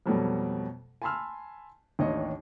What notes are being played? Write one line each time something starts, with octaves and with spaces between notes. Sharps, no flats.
F2 B2 F#3 G3 A3
G#5 A5 B5 C6 E6 F6
A1 D#2 D4 C#5 D#5